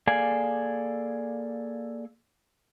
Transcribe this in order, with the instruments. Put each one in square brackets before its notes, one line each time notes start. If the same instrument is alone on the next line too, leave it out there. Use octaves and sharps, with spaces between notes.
[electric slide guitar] A#3 G#4 A4 D5 F5 G#5